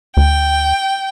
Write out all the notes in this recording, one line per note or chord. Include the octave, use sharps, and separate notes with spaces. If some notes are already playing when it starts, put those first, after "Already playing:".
D2 G5